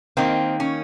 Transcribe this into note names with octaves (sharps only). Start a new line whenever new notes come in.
D#3 A#3 C4
C#4